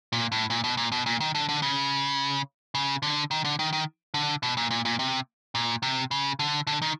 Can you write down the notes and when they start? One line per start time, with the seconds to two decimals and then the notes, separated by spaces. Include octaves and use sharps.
0.13 A#2
0.32 A2
0.50 A#2
0.64 B2
0.77 A#2
0.92 B2
1.06 A#2
1.20 D#3
1.35 D3
1.49 D3
1.62 C#3
2.75 C#3
3.03 D3
3.31 D#3
3.45 D3
3.59 D#3
3.73 D#3
4.14 D3
4.43 B2
4.57 A#2
4.71 A#2
4.85 A#2
4.99 C3
5.55 A#2
5.83 C3
6.11 C#3
6.39 D3
6.67 D3
6.82 D#3